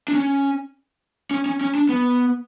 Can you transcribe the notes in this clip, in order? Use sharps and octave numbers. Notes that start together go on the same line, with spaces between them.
D4
C#4
C#4
C#4
C#4
D4
B3